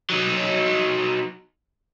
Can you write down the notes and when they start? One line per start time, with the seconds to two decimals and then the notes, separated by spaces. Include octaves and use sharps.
0.10 F#3 D#4